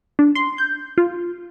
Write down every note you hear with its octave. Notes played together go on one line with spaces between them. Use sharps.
D4
C6
G6
F4